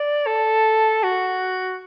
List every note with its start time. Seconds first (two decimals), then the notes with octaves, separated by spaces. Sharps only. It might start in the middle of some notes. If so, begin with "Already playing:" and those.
Already playing: D5
0.27 A4
1.04 F#4